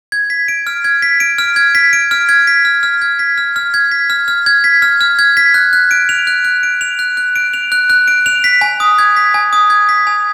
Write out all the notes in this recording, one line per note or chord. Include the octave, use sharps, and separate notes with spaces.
G#6
B6
D7
F6
G#6
B6
D7
F6
G#6
B6
D7
F6
G#6
B6
F6
F6
G#6
B6
F6
F6
G#6
B6
F6
F6
G#6
B6
F6
F6
G#6
B6
F#6
F#6
D7
F7
F#6
F#6
D7
F7
F#6
F#6
D7
F7
F#6
F#6
D7
F7
B6
G#5
D#6
G#6
B6
G#5
D#6
G#6
B6
G#5